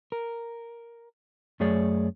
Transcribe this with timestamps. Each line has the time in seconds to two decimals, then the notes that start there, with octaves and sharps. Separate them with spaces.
0.12 A#4
1.60 F#2 A3 G#4 C#5 D5